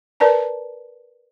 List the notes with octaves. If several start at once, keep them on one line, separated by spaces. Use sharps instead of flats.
A#4 B4 D5 A5 A#5